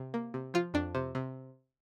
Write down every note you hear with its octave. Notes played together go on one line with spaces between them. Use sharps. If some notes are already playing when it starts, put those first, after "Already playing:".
Already playing: C3
A#3
C3
F3 F4
F2 D4
C3
C3